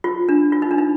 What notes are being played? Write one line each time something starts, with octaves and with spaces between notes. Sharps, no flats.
F4
D4
F4
D#4
D4
D#4